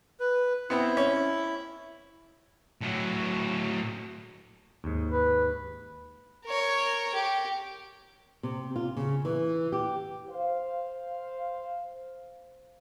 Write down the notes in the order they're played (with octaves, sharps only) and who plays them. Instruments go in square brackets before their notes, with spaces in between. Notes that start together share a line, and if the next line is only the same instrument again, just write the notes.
[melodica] B4
[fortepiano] B3 C4 [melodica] E4
[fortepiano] C#4
[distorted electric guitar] A2 F#3
[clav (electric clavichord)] D#2 G#2
[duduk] B4
[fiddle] A#4 C#5
G4
[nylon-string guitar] C3
F4
C#3
E3
G4
[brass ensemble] C5 F5